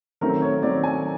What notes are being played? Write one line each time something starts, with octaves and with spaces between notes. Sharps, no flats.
D#3 F#3 A3 C4 A#4
C#5
D#3 F#3 A3 C4 D5
G#5